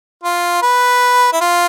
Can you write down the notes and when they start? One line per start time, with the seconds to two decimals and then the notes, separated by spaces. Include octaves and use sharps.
0.24 F4
0.62 B4
1.33 E4
1.41 F4